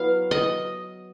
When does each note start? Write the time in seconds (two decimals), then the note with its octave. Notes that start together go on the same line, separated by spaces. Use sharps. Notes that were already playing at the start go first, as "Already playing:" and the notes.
Already playing: F#3 B3 E4 F5
0.31 D#5